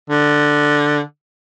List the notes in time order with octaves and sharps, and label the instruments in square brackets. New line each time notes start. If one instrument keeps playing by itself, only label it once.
[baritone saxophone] D3